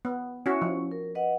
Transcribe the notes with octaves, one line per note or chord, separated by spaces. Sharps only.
B3
C#4 E4 F#4 E5
F3 C#4 E4
A#4
B4 D#5 F#5